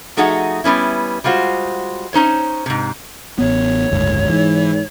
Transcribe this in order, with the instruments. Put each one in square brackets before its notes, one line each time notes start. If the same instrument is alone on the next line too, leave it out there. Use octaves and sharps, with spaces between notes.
[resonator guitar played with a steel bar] F3 A3 D#4 F#4 G#4 F#5
G3 B3 C#4 E4
G3 G#3 F4 F#4 C5
C#4 D#4 C5 C#5
G#2 C3
[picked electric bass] A1 B3 [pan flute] C#5
[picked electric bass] F#1 D2 G#2
[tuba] G#2 [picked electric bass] E3